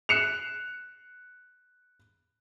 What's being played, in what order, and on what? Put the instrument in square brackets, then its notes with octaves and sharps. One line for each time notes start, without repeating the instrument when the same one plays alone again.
[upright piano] F#6 C7 C#7 E7 F7